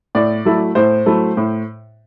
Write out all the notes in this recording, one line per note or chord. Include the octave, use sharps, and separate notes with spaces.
A2 D5
F#3 A3 E4
A2 C5
F#3 A3 E4
A2